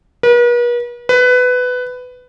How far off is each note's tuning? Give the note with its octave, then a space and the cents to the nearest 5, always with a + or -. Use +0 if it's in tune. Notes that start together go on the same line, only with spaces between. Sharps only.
B4 -45
B4 +15